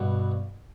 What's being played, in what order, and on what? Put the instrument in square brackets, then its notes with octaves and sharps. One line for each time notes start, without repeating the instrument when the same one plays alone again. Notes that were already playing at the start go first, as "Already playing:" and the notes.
Already playing: [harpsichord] G2 B2